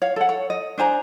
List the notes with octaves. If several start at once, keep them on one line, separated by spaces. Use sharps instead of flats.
C#5 F5
A4 F#5
C#5
D#5
D4 C5 G#5 A#5